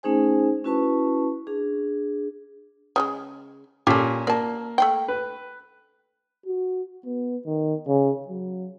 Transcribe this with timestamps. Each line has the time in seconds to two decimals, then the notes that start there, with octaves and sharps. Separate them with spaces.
0.03 A3 C#4 D#4 G#4 C5 G#5
0.64 C#4 E4 F#4 B4 A5 C#6
1.47 D4 G#4
2.96 C#3 G3 G#3
3.87 A#2 C#4 G4 A4
4.27 A#3 D5 A5
4.78 A3 F5 G5
5.08 B4
6.46 F#4
7.05 B3
7.46 D#3
7.87 C#3
8.28 F#3